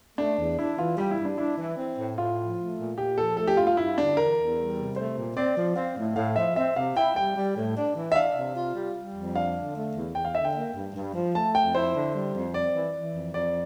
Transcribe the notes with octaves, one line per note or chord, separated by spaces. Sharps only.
A3 D4
E2
D4 E4
E3 F4
G3 G4
E4
G2
D4
D4 E4
E3
C4
A2
A2 F4
F3
A3
A#2
A#2 G4
F3 A4
A3 A4
G4
G2 F4
F4
G2 E4
D3 D4
E3 A#4
E2
G3
C3
A3 C5
A#2
C4 D5
F3
C4 F5
A2
A2 F5
F3 E5
C4 E5
C3 F5
E4 G5
G3 G5
G3
A2
D4
E3
E5
D4 F5
C3
F4
G3
G3
F2
D4 F5
D3
A3
E2
E2 G5
F5
D3 E5
G5
A#3
G2
G2
F3
A3 A5
F2 G5
E4 C5
D3
G3
F2
C4 D5
E3
E3
F2
F2 D5